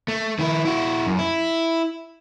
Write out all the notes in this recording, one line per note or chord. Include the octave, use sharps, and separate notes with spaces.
A3
D#3 E4
E4 F#4
F#2
E4